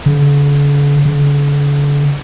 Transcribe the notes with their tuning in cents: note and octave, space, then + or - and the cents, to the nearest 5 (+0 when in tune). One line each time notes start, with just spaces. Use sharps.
D3 -45
D3 -45